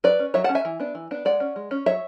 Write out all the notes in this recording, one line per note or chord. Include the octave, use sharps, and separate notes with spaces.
F#3 B4 D5
C#4
F#3 C#5 E5
F#5 A5
C#4
E5 G#5
E3
B3 D4
E3
B3 D4
G#3 D5 F#5
C#4
G#3
C#4
F#3 C#5 E5